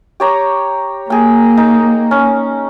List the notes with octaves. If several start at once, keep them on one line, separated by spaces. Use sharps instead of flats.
G4 C#5 A#5
A#3 G#4 G5
D#4
C#4